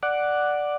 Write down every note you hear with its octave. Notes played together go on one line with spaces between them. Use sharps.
D5 F#5